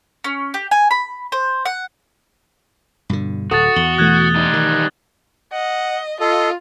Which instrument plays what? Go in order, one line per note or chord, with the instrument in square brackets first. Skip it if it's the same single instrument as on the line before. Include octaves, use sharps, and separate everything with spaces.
[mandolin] C#4
G4
G#5
B5
C5
F#5
[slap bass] G2 B2 D3
[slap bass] D1 [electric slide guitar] F#4 [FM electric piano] A4 [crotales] D#6 A6
[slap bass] E2 [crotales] F#7 G7
[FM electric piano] B2 E3 A3 [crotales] F#6 G#6
[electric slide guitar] G3 D#4
[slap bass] D#3
[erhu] D#5 [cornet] F#5
[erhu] F4 [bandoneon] A4 [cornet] D#5